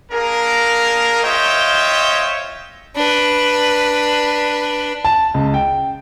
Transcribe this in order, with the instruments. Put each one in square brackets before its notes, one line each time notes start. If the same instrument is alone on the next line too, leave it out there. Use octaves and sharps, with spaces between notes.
[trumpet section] A#3 D4 G#4 A#4
F4 C5 C#5 D#5 E5 G5
[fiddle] D4 B4
[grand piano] A5
C#2
G5